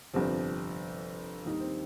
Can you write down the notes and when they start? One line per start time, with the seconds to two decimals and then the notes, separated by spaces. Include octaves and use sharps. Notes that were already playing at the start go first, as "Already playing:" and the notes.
0.14 G1 F2 C3 F3 C4
1.46 D#2 D#3 G3 D#4
1.60 C4